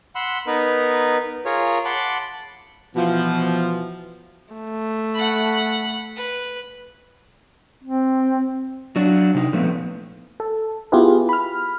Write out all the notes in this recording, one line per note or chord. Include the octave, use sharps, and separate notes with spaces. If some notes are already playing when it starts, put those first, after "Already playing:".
F#5 B5 C6 E6
B3 D#4 A#4 B4
F4 G#4 A#4 C#5
F#5 A5 B5 C6 D6
B2 E3 F3
A3
F#5 B5
B4
C4
F#3 D4 F#4
C3 D#4
A#2 F3 A3 B3 C4
A4
B3 E4 F4 G4 G#4 B4
B5 F6